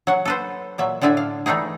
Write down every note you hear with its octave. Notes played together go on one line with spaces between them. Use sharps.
F#3 F#5
A4 B4 C5
A#2 F#3 E5
A2 D3 D4 E5 G#5
F5
E3 G3 A3 D#4 G#4